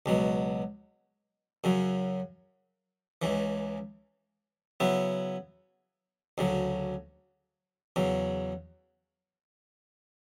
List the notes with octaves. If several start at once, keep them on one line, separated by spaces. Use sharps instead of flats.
C#2 B2 F#3
F#2 C#3 F#3
C#2 C#3 E3
C#3 F#3 B3 E4
D2 C#3 F#3
E2 C#3 F#3